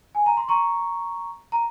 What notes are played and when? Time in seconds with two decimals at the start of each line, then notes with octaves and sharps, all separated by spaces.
0.15 G#5
0.26 A#5
0.37 C6
0.49 A#5 C#6
1.52 A#5